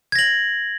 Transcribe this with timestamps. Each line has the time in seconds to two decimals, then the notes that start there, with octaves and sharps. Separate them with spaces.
0.12 G#6
0.15 A#6
0.19 F#7